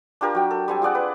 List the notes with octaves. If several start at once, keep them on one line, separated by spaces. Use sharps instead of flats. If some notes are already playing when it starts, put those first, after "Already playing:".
D4 F4 G4 A#4
F#3 G5
A4
G3 C4 G#5
F4 G#4 D5 F#5
B4